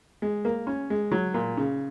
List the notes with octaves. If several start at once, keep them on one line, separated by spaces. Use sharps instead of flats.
G#3
A#3
C#4
G#3
F#3
A#2
C#3